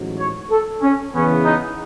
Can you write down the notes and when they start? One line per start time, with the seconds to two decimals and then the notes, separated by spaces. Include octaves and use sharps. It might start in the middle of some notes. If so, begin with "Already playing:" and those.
Already playing: A1 G#2 F#3
0.18 C#5
0.50 A4
0.82 C#4
1.14 E2 C#3 E3 B3 C#4
1.45 D#4